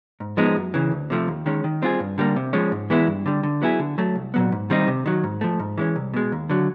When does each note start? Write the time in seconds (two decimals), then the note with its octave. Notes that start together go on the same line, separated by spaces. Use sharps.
0.20 G#2
0.37 F3 G#3 B3 D#4
0.56 F#2
0.74 C#3 E3
0.91 D2
1.10 C3 F3 A3
1.28 D#2
1.46 D#3 G#3 C#4
1.64 D#3
1.82 G3 C4 F4 G#4
2.00 G2
2.18 D3 G3 A#3
2.36 C3
2.53 F3 G#3 C#4
2.72 G#2
2.90 E3 G#3 B3 E4
3.07 G2
3.26 D3 G3
3.43 D3
3.62 F#3 B3 E4 G#4
3.79 D3
3.98 F#3 A3
4.15 C2
4.34 A#2 F#3 B3
4.52 G#2
4.70 D#3 G3 C4 D#4
4.88 C3
5.06 D#3 F#3
5.24 G#2
5.41 F3 A3
5.60 G#2
5.78 E3 G#3 C#4
5.96 C2
6.14 B2 G#3
6.32 D#2
6.50 D3 F#3